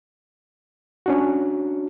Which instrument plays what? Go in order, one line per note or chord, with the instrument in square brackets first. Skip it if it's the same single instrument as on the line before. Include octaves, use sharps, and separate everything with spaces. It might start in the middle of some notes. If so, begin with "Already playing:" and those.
[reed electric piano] C#4 D4 F#4